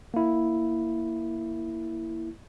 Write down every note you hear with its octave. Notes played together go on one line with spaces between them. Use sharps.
A#3 E4